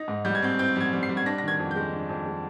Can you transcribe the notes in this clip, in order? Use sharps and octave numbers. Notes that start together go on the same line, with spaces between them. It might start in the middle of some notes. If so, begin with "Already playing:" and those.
Already playing: D#4 A#6
G#2
G3 G6
G#6
C4 G6
C4 G6
G3 G#6
G3
C7
G3
G#6
D4 A#6
A#6
D#3 G#6
F2
G#3 G6
D4
F2
G#3